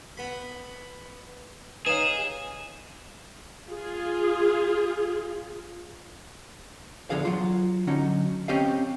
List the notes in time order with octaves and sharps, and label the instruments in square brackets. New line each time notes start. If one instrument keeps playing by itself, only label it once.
[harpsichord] B3 B5
[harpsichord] D#4 F5 [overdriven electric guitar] G#4 [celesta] B4 C#5 [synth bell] E7
[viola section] F4 G#4
[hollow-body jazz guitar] E2 D3 F3 G#4 F5
F#3 F4
D3 F#3 C#4 D#4
C4 C#4 G4 D#5 F5